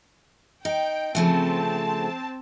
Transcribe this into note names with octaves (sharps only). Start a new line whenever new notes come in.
D#4 G5
C#3 F3 A3 C4 A5